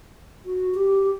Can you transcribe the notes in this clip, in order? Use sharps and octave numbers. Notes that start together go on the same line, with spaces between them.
F#4
G4